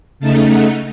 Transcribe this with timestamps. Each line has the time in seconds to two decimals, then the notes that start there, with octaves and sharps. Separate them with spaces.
0.20 C#3 A3 D#4 A5
0.48 F#5